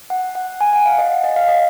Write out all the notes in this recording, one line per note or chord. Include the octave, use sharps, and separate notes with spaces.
F#5
F#5
G#5
F#5
F5
D#5
D#5
F5
D#5